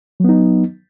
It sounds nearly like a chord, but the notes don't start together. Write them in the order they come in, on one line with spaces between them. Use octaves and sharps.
F#3 B3 D#4